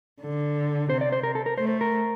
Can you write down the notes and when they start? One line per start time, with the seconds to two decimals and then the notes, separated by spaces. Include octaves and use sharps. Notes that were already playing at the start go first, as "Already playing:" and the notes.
0.21 D3
0.90 C3 C5
1.01 D5
1.12 C5
1.23 A#4
1.35 A4
1.46 A#4
1.58 A3 C5
1.69 C5
1.81 A#4